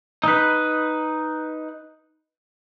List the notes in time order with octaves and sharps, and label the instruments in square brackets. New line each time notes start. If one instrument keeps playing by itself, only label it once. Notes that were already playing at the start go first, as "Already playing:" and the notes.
[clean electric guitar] D#4 B4